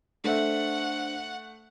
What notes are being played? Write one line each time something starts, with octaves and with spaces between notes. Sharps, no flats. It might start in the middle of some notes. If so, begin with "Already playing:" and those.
A3 D4 C5 E5 F#5